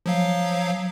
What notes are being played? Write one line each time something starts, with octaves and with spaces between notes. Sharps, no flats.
F3 F#3 F5